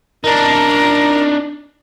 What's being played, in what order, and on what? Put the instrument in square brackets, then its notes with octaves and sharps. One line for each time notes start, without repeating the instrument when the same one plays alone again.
[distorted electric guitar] D4 D#4 [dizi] A#4